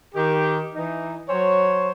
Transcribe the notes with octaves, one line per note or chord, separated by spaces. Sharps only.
D#3 G4
E3 D#4
F#3 C5 C#5